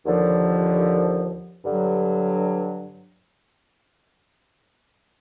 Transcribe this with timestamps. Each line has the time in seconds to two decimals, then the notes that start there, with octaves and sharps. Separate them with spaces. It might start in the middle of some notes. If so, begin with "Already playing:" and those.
0.06 D#2 D3 F3
1.64 G2 D3 F#3